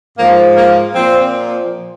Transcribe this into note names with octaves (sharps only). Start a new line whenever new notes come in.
G#2 F3 A#3
A#3
A#2 F3 C4